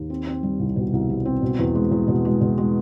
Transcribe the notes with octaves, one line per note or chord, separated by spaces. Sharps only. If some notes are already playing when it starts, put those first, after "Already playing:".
Already playing: D#2
C4
C4
G3
C2
B2
C2
G3
C4
B2
E2
G#3
E2
B2
G#3
B2
G#3